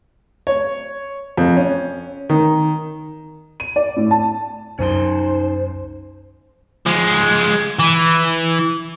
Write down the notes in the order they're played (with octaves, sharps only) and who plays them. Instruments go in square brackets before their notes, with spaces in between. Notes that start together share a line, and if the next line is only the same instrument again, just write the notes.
[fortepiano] C#5
F2
C#4
D#3
[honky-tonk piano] D#7
D5
A2
A5
[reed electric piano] C2 F#2 [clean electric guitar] C#4 D#4 C6 [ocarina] C5
[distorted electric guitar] F3 G#3
E3